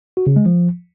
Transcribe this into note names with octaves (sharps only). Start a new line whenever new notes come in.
F#4
C#3
G#3
F3